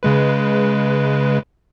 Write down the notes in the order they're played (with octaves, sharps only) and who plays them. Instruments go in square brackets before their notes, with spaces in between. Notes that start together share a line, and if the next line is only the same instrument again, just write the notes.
[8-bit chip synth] C#3 G#3 B4